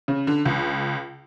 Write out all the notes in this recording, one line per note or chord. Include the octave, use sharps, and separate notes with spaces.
C#3
D3
C#2